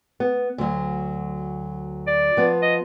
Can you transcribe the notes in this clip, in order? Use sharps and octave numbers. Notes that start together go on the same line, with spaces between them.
B3
D2 F#3
D5
F3 B3
D#5